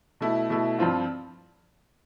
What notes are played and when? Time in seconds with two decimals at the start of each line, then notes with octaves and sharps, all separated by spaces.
0.21 B2 A3 E4
0.50 B2 A3 E4
0.78 G2 F3 C4 F4